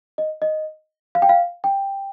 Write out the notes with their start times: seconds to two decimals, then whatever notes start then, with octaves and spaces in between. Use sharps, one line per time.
0.18 D#5
0.42 D#5
1.15 F5
1.22 G5
1.29 F5
1.64 G5